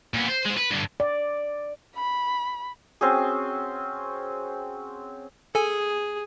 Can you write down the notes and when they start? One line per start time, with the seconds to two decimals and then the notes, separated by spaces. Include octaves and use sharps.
0.14 A#2 B3
0.28 C5
0.46 G#3 C5
0.57 B4
0.71 G2 D3
1.00 D5
1.96 B5
3.01 C4 C#4 F#4 G#4
5.55 G#4 A4 G#5